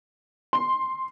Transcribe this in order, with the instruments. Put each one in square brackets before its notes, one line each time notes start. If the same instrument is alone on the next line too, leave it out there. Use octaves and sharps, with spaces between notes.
[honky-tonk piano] C6